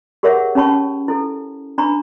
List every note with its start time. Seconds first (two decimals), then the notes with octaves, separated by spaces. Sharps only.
0.23 G4 G#4 A#4 C#5 E5 F#5
0.55 C#4 G4 C#5 A5 B5 C#6
1.08 E4 A4
1.78 D4 A#5 B5 C#6